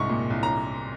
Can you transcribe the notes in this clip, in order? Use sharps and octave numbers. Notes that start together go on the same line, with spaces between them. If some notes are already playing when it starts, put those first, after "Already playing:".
Already playing: C2 G#2 C#6
A#2
C2
A#5